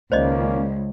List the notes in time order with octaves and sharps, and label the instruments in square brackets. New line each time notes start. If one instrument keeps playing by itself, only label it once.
[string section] C#2 [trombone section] D#3 A#3 C#4 [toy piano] C5 D5 D#5